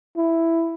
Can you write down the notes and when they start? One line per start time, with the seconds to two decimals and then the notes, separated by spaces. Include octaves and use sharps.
0.17 E4